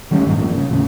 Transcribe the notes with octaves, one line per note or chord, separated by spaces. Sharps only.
D#3 G3 A3 C#4
G2 A#2 G#3
F3 A#3
C#3
D#2 A2 C#3